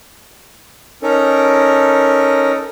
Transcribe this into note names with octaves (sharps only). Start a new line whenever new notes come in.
C#4 D#4 A4 A#4